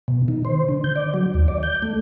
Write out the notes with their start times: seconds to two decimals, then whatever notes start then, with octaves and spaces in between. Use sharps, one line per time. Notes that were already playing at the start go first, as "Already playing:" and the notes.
0.08 B2
0.28 D#3
0.45 C5
0.69 D3
0.84 G6
0.96 D5
1.14 F#3
1.34 D#2
1.48 D5
1.63 G6
1.82 A3